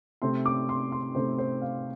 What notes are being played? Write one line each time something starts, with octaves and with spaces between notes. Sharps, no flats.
C3 A3 C4 C6
D6
C6
C6
C3 A3 C4 C5
C5
F5